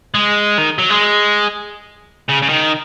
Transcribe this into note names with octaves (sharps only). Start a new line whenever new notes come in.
G#3
D#3
F#3
G#3
C#3
C#3
D#3